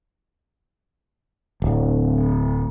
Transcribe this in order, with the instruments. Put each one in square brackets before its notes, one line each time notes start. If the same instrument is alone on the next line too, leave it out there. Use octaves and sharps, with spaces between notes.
[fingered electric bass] D1